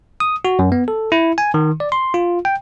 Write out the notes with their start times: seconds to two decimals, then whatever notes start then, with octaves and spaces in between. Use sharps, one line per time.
0.20 D#6
0.45 F#4
0.59 F#2
0.72 B3
0.88 A4
1.12 E4
1.38 G#5
1.54 D#3
1.80 D5
1.92 C6
2.14 F4
2.45 G5